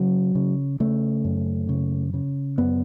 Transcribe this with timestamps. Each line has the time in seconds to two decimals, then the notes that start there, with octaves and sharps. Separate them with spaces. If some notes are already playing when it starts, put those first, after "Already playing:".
Already playing: C#3 F#3
0.35 C#3
0.80 C#3 A3
1.25 F#2
1.69 C#3
2.14 C#3
2.58 F#2 B3